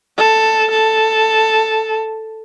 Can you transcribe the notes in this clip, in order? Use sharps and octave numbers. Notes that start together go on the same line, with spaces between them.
A4
A4